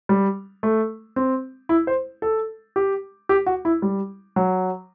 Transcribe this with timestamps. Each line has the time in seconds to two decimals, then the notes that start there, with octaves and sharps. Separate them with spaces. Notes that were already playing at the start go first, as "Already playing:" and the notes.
0.09 G3
0.63 A3
1.16 C4
1.69 E4
1.87 C5
2.22 A4
2.76 G4
3.29 G4
3.46 F#4
3.65 E4
3.82 G3
4.36 F#3